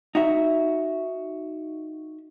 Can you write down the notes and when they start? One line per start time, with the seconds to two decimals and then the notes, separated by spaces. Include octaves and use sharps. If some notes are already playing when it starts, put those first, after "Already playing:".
0.15 D#4 F#4 E5